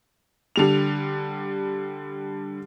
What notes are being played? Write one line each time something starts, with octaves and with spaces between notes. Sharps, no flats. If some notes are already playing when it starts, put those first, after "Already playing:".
D3 G3 F7